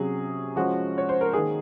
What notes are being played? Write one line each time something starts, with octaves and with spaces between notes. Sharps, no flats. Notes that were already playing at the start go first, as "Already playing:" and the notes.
Already playing: C3 F#3 C#4 G#4
F3 G#3 C#4 F#4
C#5
C5
A#4
D#3 A#3 D#4 G#4